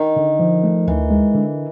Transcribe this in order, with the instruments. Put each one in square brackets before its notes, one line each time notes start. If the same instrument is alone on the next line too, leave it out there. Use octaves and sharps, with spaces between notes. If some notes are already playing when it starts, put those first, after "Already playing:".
Already playing: [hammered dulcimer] D#3
[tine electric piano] D3
F3
A3
[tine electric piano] D2 [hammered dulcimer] E3
[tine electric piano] G#3
D3